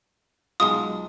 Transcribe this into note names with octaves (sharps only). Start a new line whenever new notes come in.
B1 G#3 F4 D#6